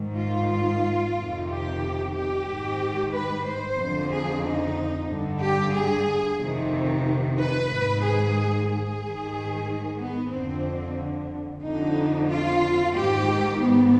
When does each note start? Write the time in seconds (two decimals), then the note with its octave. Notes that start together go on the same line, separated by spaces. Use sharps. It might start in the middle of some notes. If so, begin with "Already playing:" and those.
Already playing: G#2 D#3
0.17 F4
1.16 F2 C3 D#3
1.49 G4
2.14 G4
2.47 G#2 D#3
3.12 B4
3.45 C5
3.77 F2 D3
4.10 G#4
4.44 D#4
5.08 G2 D3
5.41 G4
5.74 G#4
6.39 F2 C3 D#3
7.38 B4
7.70 G#2 D#3
8.03 G#4
8.69 G#4
9.02 G#2 D#3
9.99 B3
10.32 F2 D3 C4
11.63 F2 D3 D#4
12.29 F4
12.94 G#2 D#3 G4
13.60 B3